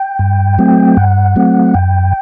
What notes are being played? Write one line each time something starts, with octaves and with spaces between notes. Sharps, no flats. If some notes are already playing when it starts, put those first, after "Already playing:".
Already playing: G5
G2
F#3 A3 C4
G2 F#5
F#3 A3 C4
F#2 G5